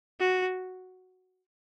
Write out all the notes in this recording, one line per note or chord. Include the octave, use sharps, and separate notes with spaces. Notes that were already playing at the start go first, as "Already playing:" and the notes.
F#4